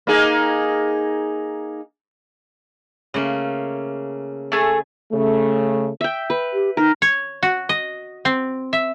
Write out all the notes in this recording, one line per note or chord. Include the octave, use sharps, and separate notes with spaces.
A#3 D#4 G#4
C#3 A3 A#3
A3 G#4
C#3 A3
E5 G5
B4
G4
D#4 A#4
C#5
F#4
D#5
C4
E5